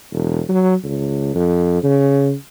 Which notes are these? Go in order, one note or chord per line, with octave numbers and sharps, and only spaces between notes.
E1
F#3
C#2
F2
C#3